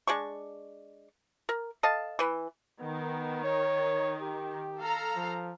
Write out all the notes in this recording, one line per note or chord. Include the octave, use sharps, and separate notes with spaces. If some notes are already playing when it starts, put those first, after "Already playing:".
G#3 D4 C#6
A#4
A4 D#5 F5 A5
E3 B4
D#3 B3
C#5
G4
A4 F5 A#5
F3